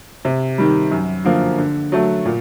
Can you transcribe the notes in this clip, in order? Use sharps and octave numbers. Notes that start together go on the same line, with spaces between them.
C3
D#3 G3
F#2
D3 F3 A#3
D3
F#3 A3
A#2